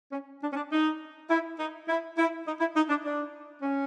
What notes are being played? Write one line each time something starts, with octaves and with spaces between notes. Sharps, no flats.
C#4
D4
C#4
D4
D#4
E4
D#4
E4
E4
D#4
E4
D#4
D4
D4
C#4